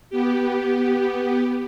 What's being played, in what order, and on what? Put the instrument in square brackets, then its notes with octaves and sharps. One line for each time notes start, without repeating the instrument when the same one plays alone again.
[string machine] B3 G4